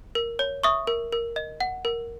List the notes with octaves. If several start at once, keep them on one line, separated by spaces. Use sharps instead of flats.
A#4
C#5
E5 C#6 D#6
A#4
A#4
D#5
F#5
A#4